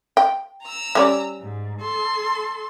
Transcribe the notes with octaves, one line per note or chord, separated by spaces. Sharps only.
G5
A#5 E6
G3 C#4 D5
G#2
A4 C6